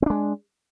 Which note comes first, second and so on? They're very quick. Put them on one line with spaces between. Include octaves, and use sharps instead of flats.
C4 D4 G#3